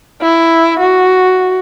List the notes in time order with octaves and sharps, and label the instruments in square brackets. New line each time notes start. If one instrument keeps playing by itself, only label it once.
[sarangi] E4
F#4